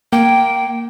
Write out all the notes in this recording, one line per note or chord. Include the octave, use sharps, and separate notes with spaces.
A#3 G5